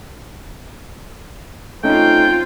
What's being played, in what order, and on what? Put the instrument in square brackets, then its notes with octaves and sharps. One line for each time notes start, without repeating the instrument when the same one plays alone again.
[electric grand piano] A3 C#4 D#4 [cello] C4 F4 [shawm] G5